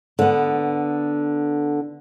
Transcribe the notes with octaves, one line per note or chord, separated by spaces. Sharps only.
D3 B3